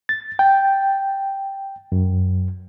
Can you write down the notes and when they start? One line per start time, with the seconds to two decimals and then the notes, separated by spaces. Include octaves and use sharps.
0.09 A6
0.39 G5
1.92 F#2